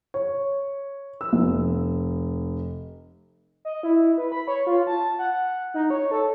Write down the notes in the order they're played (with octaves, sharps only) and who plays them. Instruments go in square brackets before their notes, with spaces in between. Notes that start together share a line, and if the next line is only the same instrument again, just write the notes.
[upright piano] C#5
E6
F1
[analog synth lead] D#5
E4
B4
B5
C#5
F4
A5
F#5
D#4
C#5
A4